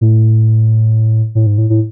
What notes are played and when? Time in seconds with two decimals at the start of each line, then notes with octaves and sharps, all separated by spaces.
0.01 A2
1.35 A2
1.46 G#2
1.58 A2
1.70 A2